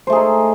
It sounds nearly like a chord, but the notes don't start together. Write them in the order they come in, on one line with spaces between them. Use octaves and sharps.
C5 A3 G#4 D#4